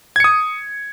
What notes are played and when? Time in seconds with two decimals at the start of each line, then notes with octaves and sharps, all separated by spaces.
0.16 G#6
0.20 C#7
0.24 D#6